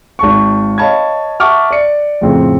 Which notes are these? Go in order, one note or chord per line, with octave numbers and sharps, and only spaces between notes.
G#1 A5 C#6
C#5 D#5 F5 A5 B5 G#6
E5 F#5 A5 C#6 D6 F6
D5 C#7
F2 A2 C#3 C4